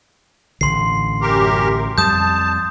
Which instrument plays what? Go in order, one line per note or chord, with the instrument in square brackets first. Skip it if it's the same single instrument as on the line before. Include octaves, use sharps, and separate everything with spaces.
[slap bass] A1 D3 [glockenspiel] C6 C7
[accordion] F#2 G4 A#4
[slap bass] F2 G3 [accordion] A5 [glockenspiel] D#6 G6